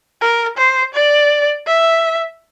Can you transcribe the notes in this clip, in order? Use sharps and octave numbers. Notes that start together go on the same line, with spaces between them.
A#4
C5
D5
E5